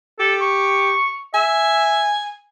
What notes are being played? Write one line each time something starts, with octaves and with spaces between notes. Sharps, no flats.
G4 A4
C#6
E5 G#5